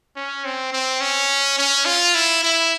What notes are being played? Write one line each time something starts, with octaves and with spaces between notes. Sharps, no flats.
C#4
C4
C4
C#4
C#4
F4
E4
E4